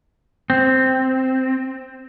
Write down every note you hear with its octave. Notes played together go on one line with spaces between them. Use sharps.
C4